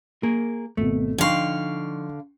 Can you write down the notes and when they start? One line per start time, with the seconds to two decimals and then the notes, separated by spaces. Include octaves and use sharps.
0.23 A#3 G#4 A#4
0.77 G#1 B2 A3
1.18 D3 F3 D#4 F5 G5 C6 C#6